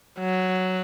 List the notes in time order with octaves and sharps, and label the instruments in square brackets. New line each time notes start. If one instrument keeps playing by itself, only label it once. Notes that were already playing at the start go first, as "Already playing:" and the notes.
[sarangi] F#3